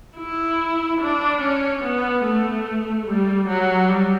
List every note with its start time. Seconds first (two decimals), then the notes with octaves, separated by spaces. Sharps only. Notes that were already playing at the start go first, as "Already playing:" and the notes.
0.18 E4
1.01 D4
1.42 C#4
1.83 B3
2.24 A3
3.07 G3
3.48 F#3
3.89 G3